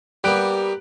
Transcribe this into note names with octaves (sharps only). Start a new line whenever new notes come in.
G3 A#3 B3 G4 F#6 D7